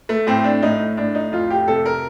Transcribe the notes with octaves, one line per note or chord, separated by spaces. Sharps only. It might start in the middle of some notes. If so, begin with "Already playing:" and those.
A3
A2 C4
D4
A2 D#4
A2 D4
D#4
F2 F4
G4
C3 A4
A#4